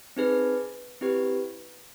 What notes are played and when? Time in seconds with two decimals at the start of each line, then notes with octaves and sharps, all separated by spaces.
0.17 C4 D#4 G#4 B4
1.01 C4 E4 G4 B4